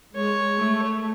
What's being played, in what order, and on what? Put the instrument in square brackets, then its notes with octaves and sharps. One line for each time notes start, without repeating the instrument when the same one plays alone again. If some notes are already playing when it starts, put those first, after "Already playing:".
[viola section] G#3 [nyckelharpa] C#5
[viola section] A3